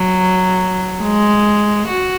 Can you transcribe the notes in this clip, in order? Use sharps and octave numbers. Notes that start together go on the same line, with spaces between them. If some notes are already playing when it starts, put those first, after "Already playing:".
Already playing: F#3
G#3
F#4